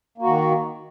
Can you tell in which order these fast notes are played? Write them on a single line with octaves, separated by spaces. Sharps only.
A#3 F#4 D#3